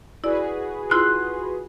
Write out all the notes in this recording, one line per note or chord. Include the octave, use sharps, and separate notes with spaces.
E4 F#4 G#4 B4 D5
E4 F4 C6 E6 F#6